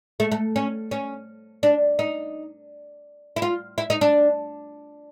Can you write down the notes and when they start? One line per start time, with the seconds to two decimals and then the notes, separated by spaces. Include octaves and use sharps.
0.20 A3
0.32 A3
0.56 C#4
0.91 C#4
1.63 D4
1.99 D#4
3.36 E4
3.42 F4
3.78 E4
3.90 D#4
4.01 D4